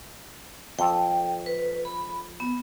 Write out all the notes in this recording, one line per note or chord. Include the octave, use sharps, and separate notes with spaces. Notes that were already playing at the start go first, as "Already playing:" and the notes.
F2 A4 G5
B4
B5
B3